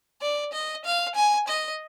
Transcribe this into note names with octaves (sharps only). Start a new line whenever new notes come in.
D5
D#5
F5
G#5
D#5